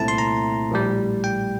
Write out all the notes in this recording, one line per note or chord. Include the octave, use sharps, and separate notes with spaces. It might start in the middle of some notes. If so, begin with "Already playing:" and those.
Already playing: C2 A#2 A3 C4 E4 A5
C6
A#5
A#1 A2 G3
G5